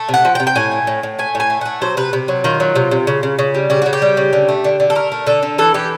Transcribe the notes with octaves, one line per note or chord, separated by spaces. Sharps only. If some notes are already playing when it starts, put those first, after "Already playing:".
Already playing: A3
C3
F#5
F3
G5
C3
G5
A2 G#5
A3
A2
A2
A3 G#5
A2
G#5
A3
A3 F#5
F#3 C5
C3 B4
C3
F#3
D#3 F4
F#3
C3
C3
C#3
C#3
C#3
G3
C#3 G4
C#3 F#4
G4
G3
C#3
D3
A3
D3
D3
A4
A3 A#4
A3
D3 A4
D3
E3 A4
E3 G4